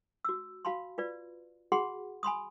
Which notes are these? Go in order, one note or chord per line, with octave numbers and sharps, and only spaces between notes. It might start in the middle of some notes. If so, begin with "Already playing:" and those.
F#4 E6
F#4 F5 A5 B5 C6
F4 B4 D5
F#4 G#4 F#5 B5 C6
G#5 B5 C6 D#6